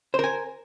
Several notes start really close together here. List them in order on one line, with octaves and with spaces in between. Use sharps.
C5 A#4 G#5